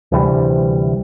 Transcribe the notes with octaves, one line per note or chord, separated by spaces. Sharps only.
D2 C3 E3 G3